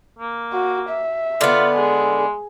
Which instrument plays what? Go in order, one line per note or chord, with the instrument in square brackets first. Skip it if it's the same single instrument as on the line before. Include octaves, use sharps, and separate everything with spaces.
[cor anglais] A#3
[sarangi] F#4
E5
[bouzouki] D3 B3 [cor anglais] F4
[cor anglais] G#3 [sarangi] G#4